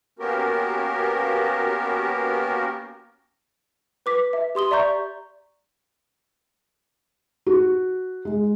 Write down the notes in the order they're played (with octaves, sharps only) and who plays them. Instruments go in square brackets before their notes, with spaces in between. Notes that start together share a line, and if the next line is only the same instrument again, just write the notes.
[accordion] A#3 B3 C#4 F#4 G4 A#4
[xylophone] B4 D6 B6
E5
G4 C6 D#6 G7
D5 E5 A#5 C#6 G6
[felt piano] F#4
G#3